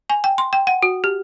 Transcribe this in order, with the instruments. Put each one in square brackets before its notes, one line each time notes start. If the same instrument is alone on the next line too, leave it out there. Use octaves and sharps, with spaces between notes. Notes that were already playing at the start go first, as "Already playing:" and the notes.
[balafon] G#5
G5
C6
G5
F#5
F#4
G4